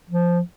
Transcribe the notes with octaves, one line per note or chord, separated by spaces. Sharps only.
F3